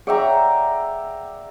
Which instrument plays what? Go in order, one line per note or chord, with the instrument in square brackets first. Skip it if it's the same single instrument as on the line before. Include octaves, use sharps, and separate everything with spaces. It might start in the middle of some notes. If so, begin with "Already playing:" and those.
[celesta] G#4 [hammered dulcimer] D5 E5 A#5 [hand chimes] F#5 G5